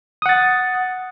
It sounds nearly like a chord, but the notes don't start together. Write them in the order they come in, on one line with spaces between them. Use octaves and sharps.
D#6 F#5 A6